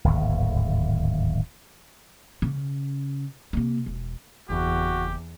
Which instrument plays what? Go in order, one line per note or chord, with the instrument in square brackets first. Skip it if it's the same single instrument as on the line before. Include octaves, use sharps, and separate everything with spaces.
[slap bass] D1 G#1 D#2
[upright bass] C#3 C#4
C3 A#3
E1
[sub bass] F#1 [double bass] E2 [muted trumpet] F#4 [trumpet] G4